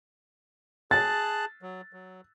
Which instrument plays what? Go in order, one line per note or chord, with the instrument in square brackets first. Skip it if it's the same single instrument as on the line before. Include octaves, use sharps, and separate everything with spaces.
[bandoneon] G#4 A5 F#6 [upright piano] A6
[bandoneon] F#3
F#3